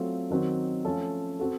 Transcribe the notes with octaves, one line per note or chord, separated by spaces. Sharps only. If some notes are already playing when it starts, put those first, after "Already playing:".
Already playing: F#3 A3 C4 F4 A4
D#3 F#3 C4
F3 A3 C#4 A4
C4 F#4 A4